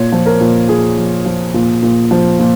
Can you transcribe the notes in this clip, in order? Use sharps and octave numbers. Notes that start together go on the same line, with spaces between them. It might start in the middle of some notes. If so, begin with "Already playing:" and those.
Already playing: A#2 C#5
F3
A#4
A#2
F3 G#4
F3
F3
A#2
A#2
F3
A#2